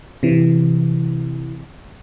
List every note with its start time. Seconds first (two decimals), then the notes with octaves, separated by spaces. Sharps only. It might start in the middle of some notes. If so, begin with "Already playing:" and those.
0.23 C3 E3